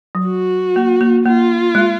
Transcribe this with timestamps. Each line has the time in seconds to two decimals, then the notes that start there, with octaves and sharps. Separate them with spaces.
0.15 F#3
0.27 F#4
0.76 A#3
1.01 A#3
1.25 A#3 F4
1.75 G#3